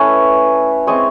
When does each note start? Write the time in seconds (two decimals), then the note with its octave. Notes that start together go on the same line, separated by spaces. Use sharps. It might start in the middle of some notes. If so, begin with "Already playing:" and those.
Already playing: A3 C#4 E4 B4 C#5
0.87 G#3 C4 E4 C#5 D#5